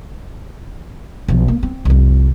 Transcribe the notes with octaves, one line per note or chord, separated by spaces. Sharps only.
B1 F3
A#3
C4
C2 F2